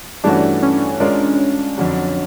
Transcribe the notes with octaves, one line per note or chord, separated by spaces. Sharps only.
G2 E3 A3 C#4 D4 F#4
C#4
G#3 C#4 D4 F4 A#4 D5
F2 D3 F#3